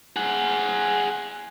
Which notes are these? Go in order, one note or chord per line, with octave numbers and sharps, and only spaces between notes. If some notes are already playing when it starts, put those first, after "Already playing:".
G#4 F#5